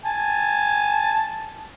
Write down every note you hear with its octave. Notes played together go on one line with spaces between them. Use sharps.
G#5 A5